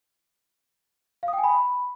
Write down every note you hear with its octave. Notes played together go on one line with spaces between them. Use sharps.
F5
D#6
G5
G#5
B5